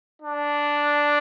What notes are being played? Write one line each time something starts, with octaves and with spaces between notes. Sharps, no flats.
D4